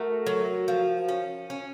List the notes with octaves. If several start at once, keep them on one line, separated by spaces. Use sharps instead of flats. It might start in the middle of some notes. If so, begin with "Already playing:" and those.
Already playing: A3 F#4 A#4
F#3
F3
C#4
C#4